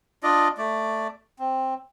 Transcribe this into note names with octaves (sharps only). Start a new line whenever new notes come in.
D4 F4 D5 D#5
A3 D5
C4